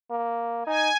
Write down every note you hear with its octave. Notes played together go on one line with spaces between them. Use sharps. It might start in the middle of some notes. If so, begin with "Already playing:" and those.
A#3
D#4 G#5